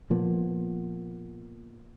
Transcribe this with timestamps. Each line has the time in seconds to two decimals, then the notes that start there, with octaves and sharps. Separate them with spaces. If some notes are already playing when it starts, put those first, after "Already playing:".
0.10 A#2 F3 A#3 B3